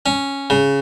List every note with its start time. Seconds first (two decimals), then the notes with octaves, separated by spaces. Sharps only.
0.06 C#4
0.50 C#3